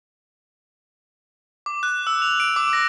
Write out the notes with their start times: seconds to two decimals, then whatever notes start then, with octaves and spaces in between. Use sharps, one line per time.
1.66 D6
1.83 F#6
2.07 E6
2.22 F7
2.40 D7
2.56 D6
2.73 A#6